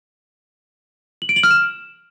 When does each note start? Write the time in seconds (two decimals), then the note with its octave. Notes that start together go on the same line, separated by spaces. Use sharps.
1.22 F#7
1.29 D7
1.36 F#7
1.43 F6
1.51 E7